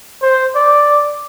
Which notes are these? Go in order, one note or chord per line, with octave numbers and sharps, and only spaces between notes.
C5
D5